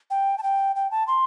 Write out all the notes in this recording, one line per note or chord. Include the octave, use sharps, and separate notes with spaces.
G5
A5
G5
G5
A5
C6